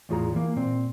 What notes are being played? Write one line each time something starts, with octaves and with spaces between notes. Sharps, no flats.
E2 A2 F4 G#4 A#5
E3 A#3
A#2 C4